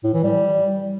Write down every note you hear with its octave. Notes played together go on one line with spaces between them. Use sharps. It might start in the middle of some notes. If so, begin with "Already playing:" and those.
A2
E3
G3